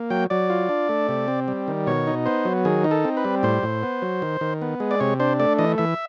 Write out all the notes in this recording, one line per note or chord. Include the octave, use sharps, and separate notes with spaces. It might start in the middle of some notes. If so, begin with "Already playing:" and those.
Already playing: A#3
F#3 G5
F#3 D5
F4
D4
A3
C3
C4
G3
D#3
B2 C#5
D#4
B3 C5
F#3
D#3 G#4
D#4
A4
C4
B4
G3
A2 C5
A2
B3
F#3
D#3
D#3
B3
G#3
D5
C3 C#5
D4 C5
A3 D5
E3 D#5
E3 E5